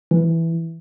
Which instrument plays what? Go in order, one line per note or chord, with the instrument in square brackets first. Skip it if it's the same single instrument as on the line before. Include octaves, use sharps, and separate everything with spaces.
[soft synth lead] E3